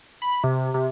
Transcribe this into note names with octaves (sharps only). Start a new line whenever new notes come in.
B5
C3
C3